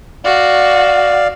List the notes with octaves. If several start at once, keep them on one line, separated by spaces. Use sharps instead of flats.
F#4 D5 F5